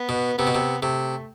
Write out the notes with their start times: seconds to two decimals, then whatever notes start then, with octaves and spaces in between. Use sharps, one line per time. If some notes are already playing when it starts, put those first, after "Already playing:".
Already playing: B3
0.09 B2
0.38 C3 B3
0.47 B2
0.55 C3
0.82 C3 A3